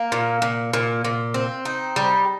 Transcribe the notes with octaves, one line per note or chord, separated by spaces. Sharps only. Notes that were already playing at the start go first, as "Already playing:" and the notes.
Already playing: A#3
A#2
A#2
A#2
A#2
C4
D#4
G3